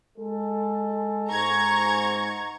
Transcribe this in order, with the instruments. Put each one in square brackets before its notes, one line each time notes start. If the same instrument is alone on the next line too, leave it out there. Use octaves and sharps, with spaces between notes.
[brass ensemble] G#3 A4
[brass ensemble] G#2 [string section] A#5 C#6 G#6